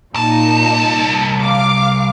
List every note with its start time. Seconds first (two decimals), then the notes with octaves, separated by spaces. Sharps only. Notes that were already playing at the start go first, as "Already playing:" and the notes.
0.14 C2 A#2 D#4 A5
1.40 F5 D6